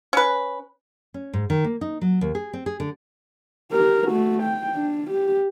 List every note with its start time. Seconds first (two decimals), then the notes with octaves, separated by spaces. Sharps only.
0.13 C#4 B4
1.14 C#4
1.33 G#2
1.50 D#3
1.64 A#3
1.81 D#4
2.01 F#3
2.21 D#2
2.35 G#4
2.53 C4
2.66 G#4
2.80 D3
3.72 G4 A#4
4.08 A3 F#4
4.43 G5
4.76 D4
5.11 G4